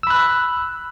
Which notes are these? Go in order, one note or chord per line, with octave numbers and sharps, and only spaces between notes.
B5 E6 F#6